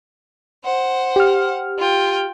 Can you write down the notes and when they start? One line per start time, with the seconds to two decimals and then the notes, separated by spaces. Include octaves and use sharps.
0.64 C5 F#5
1.16 G4 F6
1.78 F4 G5